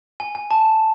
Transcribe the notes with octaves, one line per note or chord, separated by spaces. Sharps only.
G#5
G#5
A5